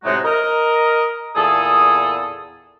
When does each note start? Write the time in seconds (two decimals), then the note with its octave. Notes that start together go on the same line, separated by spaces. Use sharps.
0.04 A2 C3 F#3 G#3 D#4 F#4
0.25 A#4 D#5
1.36 E2 A#2 G#4 A4 D#6